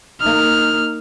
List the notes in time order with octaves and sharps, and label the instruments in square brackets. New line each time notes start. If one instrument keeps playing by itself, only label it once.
[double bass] A#3 D#4 [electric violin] F6